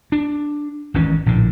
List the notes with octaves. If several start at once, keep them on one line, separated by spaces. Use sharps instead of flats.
D4
G#1 G#2 E3 C#4
A#1 A2 D3